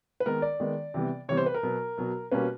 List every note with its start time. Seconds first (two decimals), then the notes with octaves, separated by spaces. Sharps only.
0.20 B4
0.26 D#3 G#3 B3 A#4
0.42 D5
0.60 D#3 G#3 B3
0.94 C3 E3 G3 B3
1.29 C3 E3 G3 B3 C#5
1.37 C5
1.46 B4
1.54 A#4
1.63 B2 F#3 B3
1.98 B2 F#3 B3
2.31 B2 G3 A#3 C#4 B4